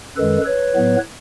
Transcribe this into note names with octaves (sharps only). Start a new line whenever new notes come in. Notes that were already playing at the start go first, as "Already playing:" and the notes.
F#2 D#3 G#3 A4 B4
B4 C#5
A2 F#3 B3